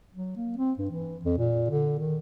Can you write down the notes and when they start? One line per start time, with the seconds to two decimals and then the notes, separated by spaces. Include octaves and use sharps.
0.15 F#3
0.36 A#3
0.57 C4
0.78 G2
0.91 E3
1.25 F2
1.38 A#2
1.70 D3
1.99 D#3